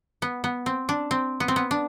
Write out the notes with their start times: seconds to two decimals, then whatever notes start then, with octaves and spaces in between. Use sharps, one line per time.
0.22 B3
0.44 B3
0.66 C4
0.89 D4
1.11 C4
1.40 B3
1.48 C4
1.56 B3
1.71 D4